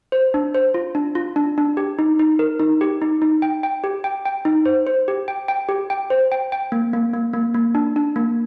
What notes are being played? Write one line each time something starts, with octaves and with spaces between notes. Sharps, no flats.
C5
D4
C5
F4
D4
F4
D4
D4
G4
D#4
D#4
A#4
D#4
G4
D#4
D#4
G5
G5
G4
G5
G5
D#4
C5
C5
G4
G5
G5
G4
G5
C5
G5
G5
A#3
A#3
A#3
A#3
A#3
D4
D4
A#3